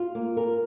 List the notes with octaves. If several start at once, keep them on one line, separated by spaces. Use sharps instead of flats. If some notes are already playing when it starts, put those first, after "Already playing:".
Already playing: F4
A#3
A#4